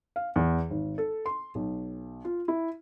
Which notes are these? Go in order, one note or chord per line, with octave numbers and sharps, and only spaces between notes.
F5
E2
G#1
A4
C6
B1
F4
E4